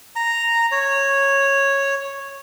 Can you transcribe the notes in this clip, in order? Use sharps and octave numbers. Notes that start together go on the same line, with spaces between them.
A#5
C#5